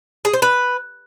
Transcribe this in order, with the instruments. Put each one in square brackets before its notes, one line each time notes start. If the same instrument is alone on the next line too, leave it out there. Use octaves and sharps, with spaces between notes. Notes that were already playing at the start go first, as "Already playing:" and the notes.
[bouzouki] G#4
C5
B4